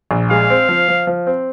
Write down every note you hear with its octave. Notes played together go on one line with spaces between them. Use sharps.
A#1
G#3 F5
C4
F3
F3
F3
C4